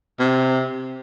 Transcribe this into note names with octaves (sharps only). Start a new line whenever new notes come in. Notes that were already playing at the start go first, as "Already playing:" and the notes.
C3